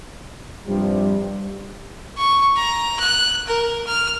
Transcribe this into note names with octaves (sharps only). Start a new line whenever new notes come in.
G2 C3 F3 G3
C#6
A#5
F#6
A#4
F6